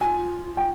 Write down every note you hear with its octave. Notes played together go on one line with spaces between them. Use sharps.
F4 F#4 G#5
G5